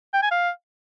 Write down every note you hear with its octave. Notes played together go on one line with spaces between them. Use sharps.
G5
G#5
F5